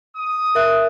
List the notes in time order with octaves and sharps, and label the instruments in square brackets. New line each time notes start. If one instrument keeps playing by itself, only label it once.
[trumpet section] D#6
[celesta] A#4 E5 F#6